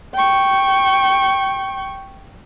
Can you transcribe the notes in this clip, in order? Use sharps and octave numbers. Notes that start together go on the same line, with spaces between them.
G5 C#6